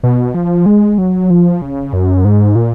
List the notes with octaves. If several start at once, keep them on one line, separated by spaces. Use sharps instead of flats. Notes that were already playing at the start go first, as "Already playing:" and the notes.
B2
F3
G#3
F#3
F3
C#3
F#2
G#2
A#2